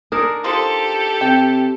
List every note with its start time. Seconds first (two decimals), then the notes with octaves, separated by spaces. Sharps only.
0.12 D4 D#4 G#4 A#4
0.44 F3 G#3 G4 A4
1.21 C3 G5